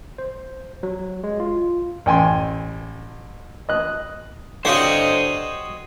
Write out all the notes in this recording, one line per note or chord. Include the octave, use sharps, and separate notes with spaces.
C5
F#3
G#3
F4
A1 G5 G#5 C6
D#5 F#6
D3 C4 F#4 G4 C5 C#5 D#5 F5